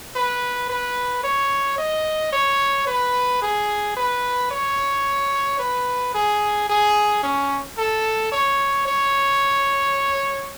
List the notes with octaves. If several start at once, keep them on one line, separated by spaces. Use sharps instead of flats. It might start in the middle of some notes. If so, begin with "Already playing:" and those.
B4
B4
C#5
D#5
C#5
B4
G#4
B4
C#5
B4
G#4
G#4
C#4
A4
C#5
C#5